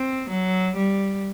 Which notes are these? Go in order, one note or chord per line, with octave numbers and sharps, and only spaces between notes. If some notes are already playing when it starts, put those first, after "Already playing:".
Already playing: C4
F#3
G3